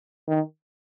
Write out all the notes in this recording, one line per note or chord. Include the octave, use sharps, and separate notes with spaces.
D#3